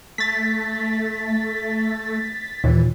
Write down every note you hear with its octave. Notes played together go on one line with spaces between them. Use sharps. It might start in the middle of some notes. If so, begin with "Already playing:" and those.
A3 A6 B6
D#2 A#2 E3